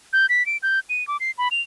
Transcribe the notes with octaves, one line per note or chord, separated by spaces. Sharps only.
G6
B6
D7
G6
D#7
D6
C7
B5
F7